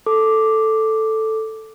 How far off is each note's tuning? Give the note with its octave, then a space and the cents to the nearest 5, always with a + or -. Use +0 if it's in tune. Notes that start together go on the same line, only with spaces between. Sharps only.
A4 +0 D6 +0